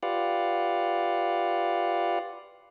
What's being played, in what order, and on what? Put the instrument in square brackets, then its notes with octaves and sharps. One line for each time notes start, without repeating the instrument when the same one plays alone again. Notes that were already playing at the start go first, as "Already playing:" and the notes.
[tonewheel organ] F4 G4 B4 D5 F5 F#5